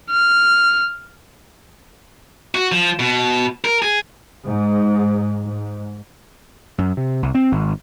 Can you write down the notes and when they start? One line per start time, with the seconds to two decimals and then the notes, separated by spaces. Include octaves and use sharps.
0.11 F6
2.55 F#4
2.72 F3
2.99 B2
3.65 A#4
3.82 G#4
4.47 G#2
5.45 G#2
6.78 F#2
6.97 C3
7.23 C2
7.35 C4
7.52 G#1